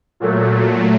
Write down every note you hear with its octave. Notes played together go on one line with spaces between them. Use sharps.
A#2 F#3 A3